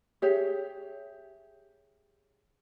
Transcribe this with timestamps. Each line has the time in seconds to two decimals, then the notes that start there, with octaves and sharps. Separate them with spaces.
0.22 G4 G#4 C#5 E5